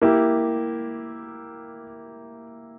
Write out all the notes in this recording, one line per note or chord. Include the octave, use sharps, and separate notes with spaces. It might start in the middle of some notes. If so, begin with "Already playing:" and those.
A#3 E4 G4